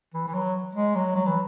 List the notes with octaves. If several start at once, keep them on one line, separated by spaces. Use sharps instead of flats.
E3
E3
F#3
G#3
F#3
F#3
E3